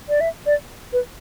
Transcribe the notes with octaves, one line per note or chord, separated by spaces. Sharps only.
D5
E5
D5
B4